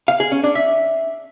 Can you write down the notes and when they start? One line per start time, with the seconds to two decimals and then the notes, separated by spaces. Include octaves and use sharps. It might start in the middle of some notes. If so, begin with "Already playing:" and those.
0.08 F5
0.20 G#4
0.32 C#4
0.44 D4
0.55 E5